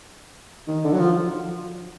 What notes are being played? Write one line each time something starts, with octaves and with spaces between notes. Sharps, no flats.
D#3
D3
F#3
F3